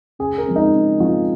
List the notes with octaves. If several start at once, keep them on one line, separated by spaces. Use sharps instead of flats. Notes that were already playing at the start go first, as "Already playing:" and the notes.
C#3 G#4
A#4
F3 G#3 C4
D#4
C#3
F3 G#3 C4 F4